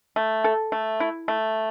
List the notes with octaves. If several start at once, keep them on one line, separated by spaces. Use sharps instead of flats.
A3
A4
A3
E4
A3